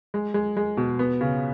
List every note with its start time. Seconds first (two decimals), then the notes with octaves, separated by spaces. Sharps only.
0.14 G#3
0.34 G#3
0.57 G#3
0.77 B2
0.99 B3
1.21 C#3